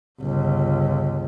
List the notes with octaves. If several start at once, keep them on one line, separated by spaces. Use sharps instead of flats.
G1 C#2